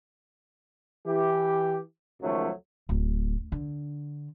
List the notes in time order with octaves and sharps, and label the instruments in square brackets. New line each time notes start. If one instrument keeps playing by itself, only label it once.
[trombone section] E3 G4
C#2 F#2 D#3 F3 F#3 A3
[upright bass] D1
D3